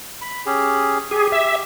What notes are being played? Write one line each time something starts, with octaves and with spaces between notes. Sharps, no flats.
B5
C#4 G4 G#4
G4 G#4
E5